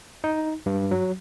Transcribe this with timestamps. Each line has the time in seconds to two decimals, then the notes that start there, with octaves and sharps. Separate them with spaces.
0.24 D#4
0.66 G2
0.91 F#3